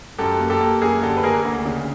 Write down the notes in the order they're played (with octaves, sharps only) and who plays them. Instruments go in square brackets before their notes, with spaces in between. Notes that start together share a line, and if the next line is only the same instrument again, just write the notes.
[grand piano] F#2 G4 A4
A#3
G4 A4
A#3
F#2 G#4 A#4
D3 G4 A4
B4
A#3 G#4 A#4
D2
C#3